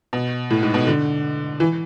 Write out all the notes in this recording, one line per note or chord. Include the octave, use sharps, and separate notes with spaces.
B2
A2
G#2
B2
D3
E3